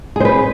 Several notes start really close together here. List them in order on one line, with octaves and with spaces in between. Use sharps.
G#4 C5 B4